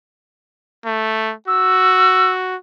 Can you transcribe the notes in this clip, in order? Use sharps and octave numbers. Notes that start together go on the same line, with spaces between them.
A3
F#4 E6